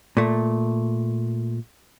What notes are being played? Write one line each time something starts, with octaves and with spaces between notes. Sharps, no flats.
A#2 A3